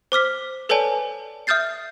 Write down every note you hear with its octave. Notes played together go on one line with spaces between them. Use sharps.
C5 D6 F6 B6
A4 B4 C#5 D5 G#5 A5
E5 D#6 F6 G6 A6 C7